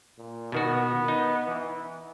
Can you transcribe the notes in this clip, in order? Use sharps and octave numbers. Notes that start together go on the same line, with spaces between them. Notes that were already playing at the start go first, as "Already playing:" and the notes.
A#2
B2 D#3 B3 F#4
D#4
E3